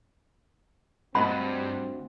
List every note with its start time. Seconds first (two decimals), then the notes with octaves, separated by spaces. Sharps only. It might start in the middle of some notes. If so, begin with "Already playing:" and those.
1.15 D2 G2 C4 D#5 F#5 B5